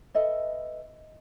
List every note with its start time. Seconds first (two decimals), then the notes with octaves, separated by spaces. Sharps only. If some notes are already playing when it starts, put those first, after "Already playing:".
0.14 A4 B4 D#5 E5